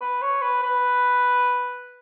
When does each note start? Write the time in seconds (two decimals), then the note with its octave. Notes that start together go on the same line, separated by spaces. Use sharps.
0.01 B4
0.22 C#5
0.42 B4
0.63 B4